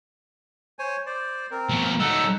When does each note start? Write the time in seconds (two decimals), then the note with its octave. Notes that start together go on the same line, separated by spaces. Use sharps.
0.79 C5 C#5 G#5
1.06 C5 D5
1.51 C4 A#4
1.69 B2 F3
2.00 F#3 A3 D#4 F#5 E6